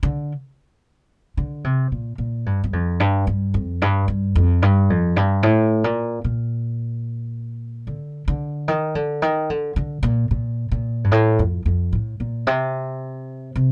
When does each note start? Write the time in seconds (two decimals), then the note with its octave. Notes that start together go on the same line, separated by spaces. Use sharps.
0.03 D3
1.37 D3
1.64 C3
1.92 A#2
2.18 A#2
2.46 G2
2.64 G2
2.73 F2
3.00 G2
3.27 G2
3.54 F2
3.82 G2
4.08 G2
4.36 F2
4.62 G2
4.90 F2
5.16 G2
5.43 A2
5.84 A#2
6.24 A#2
7.87 D3
8.28 D3
8.68 D#3
8.95 D3
9.22 D#3
9.50 D3
9.76 D3
10.03 A#2
10.31 A#2
10.72 A#2
11.04 G2
11.12 A2
11.39 F2
11.66 F2
11.93 A2
12.20 A#2
12.47 C3
13.56 C3